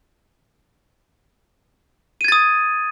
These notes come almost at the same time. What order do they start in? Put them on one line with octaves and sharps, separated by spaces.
D#7 G#6 A6 D#6